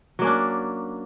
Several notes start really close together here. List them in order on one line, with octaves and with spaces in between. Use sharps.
F#3 A#3 C#4 D4